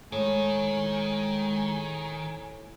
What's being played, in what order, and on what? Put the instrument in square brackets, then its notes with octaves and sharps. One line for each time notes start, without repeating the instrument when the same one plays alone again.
[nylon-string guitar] A2 [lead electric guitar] D#3 [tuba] G#3 [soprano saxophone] G#5